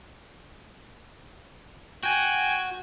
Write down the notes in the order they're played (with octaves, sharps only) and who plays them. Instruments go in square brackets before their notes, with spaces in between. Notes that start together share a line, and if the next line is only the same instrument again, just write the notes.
[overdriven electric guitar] F#4 [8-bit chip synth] G5 G#5